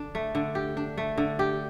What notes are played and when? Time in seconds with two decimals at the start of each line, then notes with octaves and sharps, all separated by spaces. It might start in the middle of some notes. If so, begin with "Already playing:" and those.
Already playing: D3 D4
0.15 A3
0.35 D3
0.55 G4
0.77 D4
0.98 A3
1.18 D3
1.39 G4